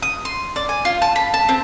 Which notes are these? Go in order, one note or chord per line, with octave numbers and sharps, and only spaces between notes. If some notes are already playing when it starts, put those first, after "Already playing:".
D#6
C6
D5
G#5
F4
A5
B5
A5
C4